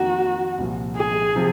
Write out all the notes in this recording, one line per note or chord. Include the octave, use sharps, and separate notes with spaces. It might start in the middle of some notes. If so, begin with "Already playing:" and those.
Already playing: F2 D#3 A#3 F#4
C2 A#2 F3
G#4
C3 F3